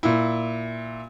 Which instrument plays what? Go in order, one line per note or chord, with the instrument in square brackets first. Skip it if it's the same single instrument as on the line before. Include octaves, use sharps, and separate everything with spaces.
[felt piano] A#2 E4